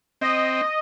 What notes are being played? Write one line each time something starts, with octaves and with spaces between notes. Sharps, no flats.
C4 D#5